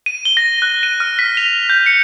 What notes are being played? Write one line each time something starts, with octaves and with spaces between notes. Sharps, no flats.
D#7
G7
A#6
F#6
D#7
F6
B6
F7
G6
C#7